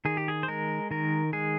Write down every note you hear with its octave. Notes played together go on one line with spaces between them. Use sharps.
D#3 G#4
G4
G#4
C5
G#3 A#4
D#3 A#4
G#3 G#4